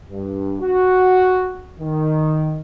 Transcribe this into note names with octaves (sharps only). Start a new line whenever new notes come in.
G2
F#4
D#3